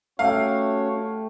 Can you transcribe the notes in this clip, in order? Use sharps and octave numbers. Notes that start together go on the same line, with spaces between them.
A3 C#4 F#4 G4 C#5 F5